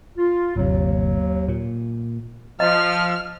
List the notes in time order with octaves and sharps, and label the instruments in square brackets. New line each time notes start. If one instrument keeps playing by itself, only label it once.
[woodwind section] F4
[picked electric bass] G1 C3 [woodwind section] D#2 F#3
[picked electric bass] A#2
[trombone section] F3 [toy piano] D#5 A#5 [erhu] F6